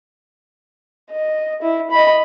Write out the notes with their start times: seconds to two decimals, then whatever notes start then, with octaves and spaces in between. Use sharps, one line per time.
1.11 D#5
1.62 E4
1.91 D#5 B5